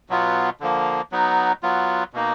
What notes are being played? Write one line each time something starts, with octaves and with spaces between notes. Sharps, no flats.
B2 F#3 B3 F4
D3 F3 A#3
F#3 B3 D#4
F#3 B3 F4
B2 A#3 D#4